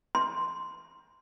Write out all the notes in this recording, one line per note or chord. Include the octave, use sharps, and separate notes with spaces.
C6